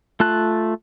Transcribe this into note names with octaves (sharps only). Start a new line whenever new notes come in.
A3 F4 A5 F#6